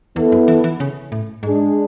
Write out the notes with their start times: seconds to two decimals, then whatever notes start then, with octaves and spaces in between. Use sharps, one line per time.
0.16 E2 B3 E4 A4
0.32 F#2
0.48 E3
0.64 E3
0.80 C#3
1.12 A2
1.43 G#2 G#3 D4 G#4